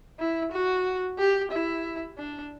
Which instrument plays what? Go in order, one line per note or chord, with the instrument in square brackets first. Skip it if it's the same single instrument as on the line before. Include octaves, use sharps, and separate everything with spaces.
[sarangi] E4
F#4
G4
E4
D4